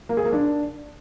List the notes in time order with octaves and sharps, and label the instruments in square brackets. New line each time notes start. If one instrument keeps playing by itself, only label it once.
[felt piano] A#3
G#4
A#3
D4